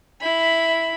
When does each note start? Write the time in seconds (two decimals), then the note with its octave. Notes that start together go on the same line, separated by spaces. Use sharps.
0.21 E4 B5